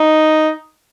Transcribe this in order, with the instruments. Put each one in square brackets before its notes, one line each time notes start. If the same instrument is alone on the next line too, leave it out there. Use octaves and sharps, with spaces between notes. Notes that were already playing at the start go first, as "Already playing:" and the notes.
Already playing: [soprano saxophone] D#4